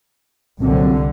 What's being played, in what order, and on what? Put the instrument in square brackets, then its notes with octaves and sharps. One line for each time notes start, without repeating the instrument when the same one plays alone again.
[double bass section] C2 D3 [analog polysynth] A#2 F#3 C4